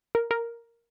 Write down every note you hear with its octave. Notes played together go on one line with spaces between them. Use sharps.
A#4
A#4